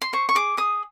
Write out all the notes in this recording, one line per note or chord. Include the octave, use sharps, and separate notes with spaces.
C6
C5 C#6
C#6
G#4 D6
G#4 D#6